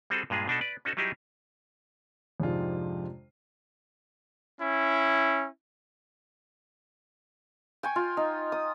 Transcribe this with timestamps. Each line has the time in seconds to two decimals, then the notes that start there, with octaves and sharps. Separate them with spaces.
0.10 G3 C4 F#4 G#4 A4
0.30 G2 A#2 G#3 F4 G#4
0.48 B2 D4 D#4 A4
0.61 B4 D5
0.85 C#4 D#4 F#4 A4
0.97 F#3 G3 D#4 E4 G4 G#4
2.40 F2 G#2 C3 G#3 D4 F4
4.61 C#4 E4
7.83 G5 G#5 C#6
7.96 F4
8.17 D#4
8.52 D#6